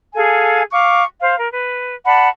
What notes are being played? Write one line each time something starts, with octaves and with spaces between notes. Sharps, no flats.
G#4 A4 F5 G#5
F5 C#6 D6
C5 F5
A#4
B4
D5 F#5 A5 B5